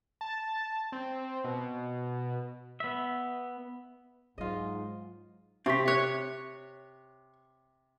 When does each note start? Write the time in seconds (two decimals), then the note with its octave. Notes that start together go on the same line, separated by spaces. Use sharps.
0.21 A5
0.92 C4
1.44 B2
2.80 B3 E5
4.38 G#2 F#3 F4 D#5
5.66 C3 C4 E5 C#6 B6
5.88 C#5 F#6